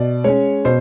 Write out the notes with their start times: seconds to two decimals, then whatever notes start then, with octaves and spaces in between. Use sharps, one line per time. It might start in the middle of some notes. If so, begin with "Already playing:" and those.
Already playing: B2 D5
0.24 G#3 C#4 C#5
0.65 B2 C5